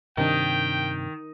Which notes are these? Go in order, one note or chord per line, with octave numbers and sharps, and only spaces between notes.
G2 C3 D#3 D4 G5